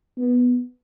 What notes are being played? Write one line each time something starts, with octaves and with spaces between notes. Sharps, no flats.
B3